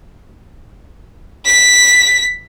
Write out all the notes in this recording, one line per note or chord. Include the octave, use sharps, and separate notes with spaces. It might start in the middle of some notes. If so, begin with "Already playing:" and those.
B6